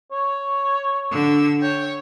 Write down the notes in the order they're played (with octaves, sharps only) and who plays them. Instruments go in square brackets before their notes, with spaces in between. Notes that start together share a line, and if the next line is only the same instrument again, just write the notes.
[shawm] C#5
[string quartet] D3 E6
[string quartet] C#5 [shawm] G5